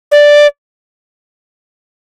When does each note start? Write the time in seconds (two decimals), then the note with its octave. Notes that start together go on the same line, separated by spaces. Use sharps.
0.12 D5